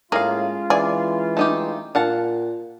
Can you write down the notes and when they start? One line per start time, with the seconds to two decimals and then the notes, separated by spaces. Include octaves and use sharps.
0.12 A2 G#3 A#3 C#4 F4 G#4 F5
0.70 E3 G#4 D5
1.37 A3 D#4 G4
1.95 A#2 F5 F#5 A5